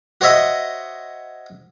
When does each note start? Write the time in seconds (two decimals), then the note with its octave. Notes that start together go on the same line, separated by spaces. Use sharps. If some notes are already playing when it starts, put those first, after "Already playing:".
0.21 F#4 C5 C#5 D#5 E5